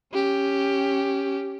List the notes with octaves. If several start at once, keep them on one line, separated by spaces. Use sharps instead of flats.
C#4 G4